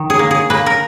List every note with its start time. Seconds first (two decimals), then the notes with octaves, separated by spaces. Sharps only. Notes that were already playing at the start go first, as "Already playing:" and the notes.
Already playing: D#3
0.10 G#4
0.19 A#3
0.31 G#4
0.50 A#3 B4
0.66 A#4